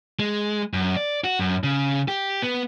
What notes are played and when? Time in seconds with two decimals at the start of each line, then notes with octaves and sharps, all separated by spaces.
0.19 G#3
0.73 F#2
0.96 D5
1.24 F#4
1.39 F#2
1.64 C#3
2.08 G4
2.42 B3